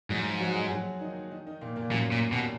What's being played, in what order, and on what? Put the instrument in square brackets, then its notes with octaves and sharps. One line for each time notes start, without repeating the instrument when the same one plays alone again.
[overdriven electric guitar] G#2 [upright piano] F#3 F#4
[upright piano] F3 F4
F#3 F#4
G#3 G#4
G#4
F#3 F#4
D#3 D#4
D#3 D#4
D#3 D#4
A#2 A#3
A#2 A#3
[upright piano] F#2 F#3 [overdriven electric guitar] A#2
[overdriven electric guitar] A#2
[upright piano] D#2 D#3 [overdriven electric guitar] B2